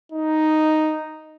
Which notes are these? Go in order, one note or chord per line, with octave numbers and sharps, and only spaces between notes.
D#4